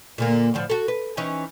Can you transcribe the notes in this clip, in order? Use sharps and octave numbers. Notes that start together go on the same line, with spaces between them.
A#2 D3 A#3
A2 D3 F3
F#4 A4
B4
E3 C#4 D#4